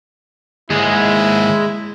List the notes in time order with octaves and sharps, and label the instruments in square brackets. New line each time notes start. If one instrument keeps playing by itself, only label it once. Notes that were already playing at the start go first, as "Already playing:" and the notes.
[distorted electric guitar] D#2 G#2 [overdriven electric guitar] G#3 G#4 [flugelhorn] E4